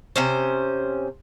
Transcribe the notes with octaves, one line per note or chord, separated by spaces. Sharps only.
C3 C#4 C5